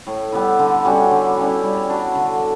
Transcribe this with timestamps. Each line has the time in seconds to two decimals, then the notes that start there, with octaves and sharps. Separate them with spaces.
0.07 A2
0.32 G3 B3 E4
0.59 D3
0.85 G3 C#4 F#4
1.11 D3
1.37 G3 C#4 E4
1.63 G3
1.89 D4 F#4
2.15 D3